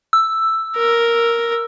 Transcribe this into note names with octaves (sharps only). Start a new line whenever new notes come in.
E6
A#4